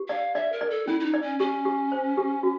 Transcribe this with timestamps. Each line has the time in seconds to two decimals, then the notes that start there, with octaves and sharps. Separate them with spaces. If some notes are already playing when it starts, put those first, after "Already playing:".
Already playing: G4
0.09 D5 F5
0.35 D5 E5
0.52 A#4
0.61 D5
0.70 A4
0.87 C#4 E4
1.00 E4
1.05 D#4
1.14 D5
1.22 C#4
1.39 C#4 G4
1.65 G4
1.92 C5
2.17 G4
2.43 F#4